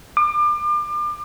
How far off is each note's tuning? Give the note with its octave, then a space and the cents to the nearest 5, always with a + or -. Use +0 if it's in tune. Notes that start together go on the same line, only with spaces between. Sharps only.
D6 +35